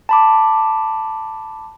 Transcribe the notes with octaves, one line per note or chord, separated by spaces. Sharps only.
A5 B5 D6